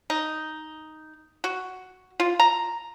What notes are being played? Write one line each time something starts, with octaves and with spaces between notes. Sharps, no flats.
D#4
F#4
F4
A#5